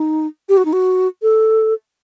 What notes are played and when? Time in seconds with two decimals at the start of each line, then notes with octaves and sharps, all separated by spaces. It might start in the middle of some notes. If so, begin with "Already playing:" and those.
Already playing: D#4
0.49 G4
0.57 F#4
0.65 D#4
0.73 F#4
1.22 A4